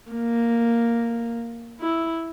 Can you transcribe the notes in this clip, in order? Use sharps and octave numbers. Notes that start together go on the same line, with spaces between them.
A#3
E4